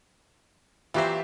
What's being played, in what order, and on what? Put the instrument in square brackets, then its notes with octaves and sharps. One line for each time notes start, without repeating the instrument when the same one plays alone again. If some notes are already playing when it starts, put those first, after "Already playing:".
[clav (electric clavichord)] A#2 F#3 C4 [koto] E3 C5 [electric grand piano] F4 G4 E5